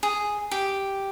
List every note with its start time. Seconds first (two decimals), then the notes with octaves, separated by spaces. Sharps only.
0.03 G#4
0.51 G4